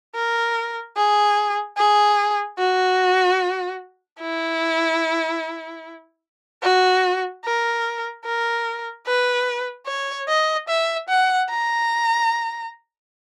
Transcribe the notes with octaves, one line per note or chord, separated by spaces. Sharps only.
A#4
G#4
G#4
F#4
E4
F#4
A#4
A#4
B4
C#5
D#5
E5
F#5
A#5